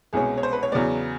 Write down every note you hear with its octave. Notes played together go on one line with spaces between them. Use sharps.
C2 B2 G#3 C#4 G#4
C#5
C5
B4
C#5
E2 C#3 F#3 B3 D5